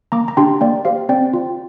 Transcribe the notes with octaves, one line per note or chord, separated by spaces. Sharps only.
A#3 A#5 D6
A#5
D4 G4 G5 C6
A#3 D5 G5
G4 C5 F5
C4 D5 G5
F4